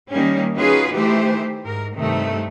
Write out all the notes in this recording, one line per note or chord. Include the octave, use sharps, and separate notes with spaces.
D#3 G3 A#3 C#4
D#3 C#4 F4 F#4 G#4 B4
D#3 E3 A3 G4 C5
G#2 A#4
G2 C3 D#3 A3